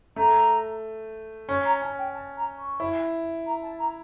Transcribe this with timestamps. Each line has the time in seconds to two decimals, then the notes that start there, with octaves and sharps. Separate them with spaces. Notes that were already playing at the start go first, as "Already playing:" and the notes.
0.16 A3 A#5
1.48 C#4 C#6
1.65 A#5
1.81 C#4 A5
1.98 G5
2.14 A5
2.37 A#5
2.58 C#6
2.80 E4
3.46 A#5
3.62 A5
3.79 A#5